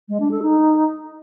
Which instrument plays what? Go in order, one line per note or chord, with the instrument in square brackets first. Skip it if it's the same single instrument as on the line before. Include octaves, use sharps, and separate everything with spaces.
[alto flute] G#3
D4
A4
D#4